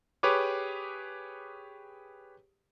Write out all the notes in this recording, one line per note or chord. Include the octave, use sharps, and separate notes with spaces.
G4 G#4 B4 C#5 D6